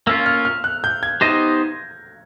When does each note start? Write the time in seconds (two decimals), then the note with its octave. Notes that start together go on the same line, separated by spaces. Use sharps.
0.07 A#3 C#4 F4 E6
0.26 F6
0.45 F6
0.64 F#6
0.84 G6
1.03 G#6
1.21 B3 D#4 G4 C5 D#5 A#6